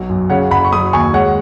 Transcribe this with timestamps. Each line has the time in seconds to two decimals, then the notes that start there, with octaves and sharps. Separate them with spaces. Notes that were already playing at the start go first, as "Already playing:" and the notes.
Already playing: B1 F#3
0.09 F#2
0.30 C#3 C#5 F#5
0.51 F#1 F#5 B5
0.65 C#6
0.72 F#3 B5 D#6
0.93 D#2 G#5 C#6
1.14 G#3 C#5 F#5